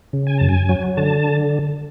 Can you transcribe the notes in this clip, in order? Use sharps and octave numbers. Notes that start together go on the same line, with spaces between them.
C#3
G#5
F#2 A5
G#5
F#3
D3 A5